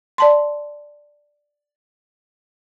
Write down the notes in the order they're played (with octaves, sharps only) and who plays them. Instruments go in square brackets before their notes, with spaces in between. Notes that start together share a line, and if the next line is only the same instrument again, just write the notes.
[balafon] D5 A5 C6